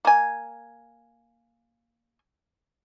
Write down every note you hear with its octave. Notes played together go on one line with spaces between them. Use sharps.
A#3 G#5